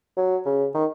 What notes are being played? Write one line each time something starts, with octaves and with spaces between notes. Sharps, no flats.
F#3
C#3
D#3